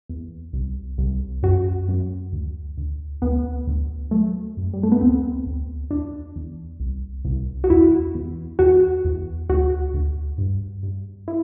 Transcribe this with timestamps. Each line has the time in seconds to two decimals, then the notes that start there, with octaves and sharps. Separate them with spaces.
0.09 E2
0.53 C2
0.98 C2
1.43 F#2 F#4
1.88 F#2
2.33 D2
2.77 D2
3.22 D2 B3
3.67 D2
4.11 F#3 A3
4.57 F#2
4.74 G3
4.83 A3
4.92 B3
5.01 D2 C4
5.46 D2
5.91 E2 D4
6.36 E2
6.80 C2
7.25 C2
7.64 F#4
7.70 E2 E4
8.15 E2
8.59 E2 F#4
9.05 E2
9.49 D2 F#4
9.94 D2
10.38 G2
10.83 G2
11.28 E4